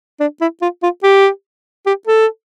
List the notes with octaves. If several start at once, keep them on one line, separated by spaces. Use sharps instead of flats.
D4
E4
F4
F4
G4
G4
A4